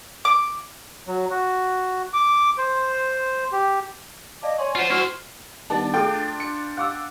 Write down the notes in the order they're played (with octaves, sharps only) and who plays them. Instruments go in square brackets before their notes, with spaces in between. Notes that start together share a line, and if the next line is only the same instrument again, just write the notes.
[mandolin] D6
[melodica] F#3
F#4
D6
C5
G4
[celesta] D5 F5 A5 [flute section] D#5 D6
[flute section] C#5 G#5 [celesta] D5 C6 C#6
[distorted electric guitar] F4 C5 [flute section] C#5 F#5
[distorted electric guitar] E4 C5 [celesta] F#4 F#5 C#6 [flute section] F6
[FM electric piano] D#3 G3 B3 [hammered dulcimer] D4 [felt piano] A5
[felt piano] A3 G#4 [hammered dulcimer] D4 F4 [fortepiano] G5 [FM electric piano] G6 A6
[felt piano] C#7
[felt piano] F5 D6 E6 [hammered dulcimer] F#5